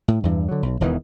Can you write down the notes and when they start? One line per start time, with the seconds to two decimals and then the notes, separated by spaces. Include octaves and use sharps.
0.08 A2
0.23 E2 G2 E3
0.49 D3 F#3
0.63 B1
0.81 E1 E2 D#3 E3